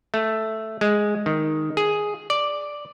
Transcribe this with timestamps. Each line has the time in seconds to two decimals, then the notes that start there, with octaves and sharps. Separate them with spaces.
0.14 A3
0.81 G#3
1.26 D#3
1.77 G#4
2.30 D5